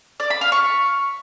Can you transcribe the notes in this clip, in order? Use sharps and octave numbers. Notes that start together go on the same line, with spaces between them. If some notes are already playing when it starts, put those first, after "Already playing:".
D5
B5
F5
C#6